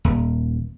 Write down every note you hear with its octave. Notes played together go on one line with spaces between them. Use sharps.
D#1